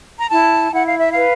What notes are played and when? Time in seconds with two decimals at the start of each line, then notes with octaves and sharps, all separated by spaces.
0.19 A#5
0.29 E4 A5
0.73 E4 F#5
0.86 F5
0.99 E5
1.11 B4 F5